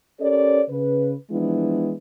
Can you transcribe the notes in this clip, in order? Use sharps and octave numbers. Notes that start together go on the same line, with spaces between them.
C#4 G4 A4 A#4 C#5 D5
C#3 B4
E3 F3 G#3 B3 D4 E4